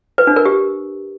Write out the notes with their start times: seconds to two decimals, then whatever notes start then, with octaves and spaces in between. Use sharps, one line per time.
0.18 B4
0.27 D4
0.36 A#4
0.45 G4